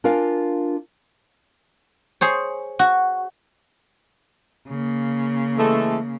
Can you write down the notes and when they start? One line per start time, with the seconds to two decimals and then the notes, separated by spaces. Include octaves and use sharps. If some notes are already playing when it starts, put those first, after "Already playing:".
0.04 D4 F4 A#4 F5 G#5
2.21 G#4 C5 C#5
2.79 F#4
4.68 C#3 A#3
5.57 E3 G#3 A3